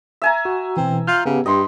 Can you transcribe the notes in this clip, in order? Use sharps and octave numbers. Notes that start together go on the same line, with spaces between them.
E5 G#5 A#5
F#4
B2 E3 C4
F4 F6 G6
C#3 B3 G4
G2 G4 D#5 B5 C6